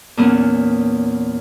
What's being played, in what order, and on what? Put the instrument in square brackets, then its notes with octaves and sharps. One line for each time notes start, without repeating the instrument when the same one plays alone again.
[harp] E2 A#2 B3 C#4